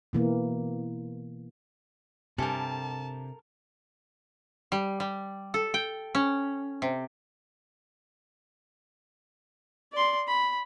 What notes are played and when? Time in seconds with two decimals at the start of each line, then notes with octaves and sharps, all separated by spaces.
0.13 B2 E3 A#3
2.38 G2 C3 G4 A4 A#4 G#5 A5
4.72 G3
5.00 G3
5.54 A4
5.74 G5
6.15 C#4
6.82 C3
9.93 D5 C6
10.27 B5